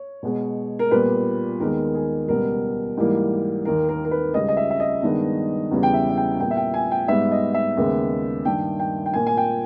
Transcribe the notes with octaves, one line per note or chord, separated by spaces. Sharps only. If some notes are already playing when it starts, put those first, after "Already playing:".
Already playing: C#5
B2 G#3 B3
A#4
A#2 G3 B3 B4
D#2 D#3 G#3 B3 A#4
G#4
C#2 B2 G3 B3 A#4
G#2 E3 G3 A#3
D#2 D#3 A#3 A#4
A#4
A#4
B4
C#2 C#3 G3 D#5
D#5
E5
E5
D#5
G2 D#3 G#3 B3
E2 C#3 G3 B3
G5
E5
E5
G5
A#2 G3 B3 G5
E5
G5
G#5
G5
G#2 G3 B3 E5
D#5
E5
D#2 C#3 G#3 B3
G2 D#3 A#3 G5
G5
G5
A#2 A#3 G#5
G#5
G5